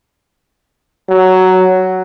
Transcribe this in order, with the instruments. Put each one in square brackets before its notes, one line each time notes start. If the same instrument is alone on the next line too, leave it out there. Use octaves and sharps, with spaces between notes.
[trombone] F#3